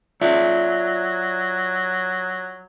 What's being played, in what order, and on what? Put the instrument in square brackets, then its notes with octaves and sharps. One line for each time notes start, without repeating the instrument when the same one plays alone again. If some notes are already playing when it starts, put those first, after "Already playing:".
[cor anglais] F#3 [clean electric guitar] F4 D5 E5